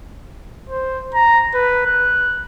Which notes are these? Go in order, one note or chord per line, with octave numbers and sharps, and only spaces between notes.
C5
A#5
B4
F#6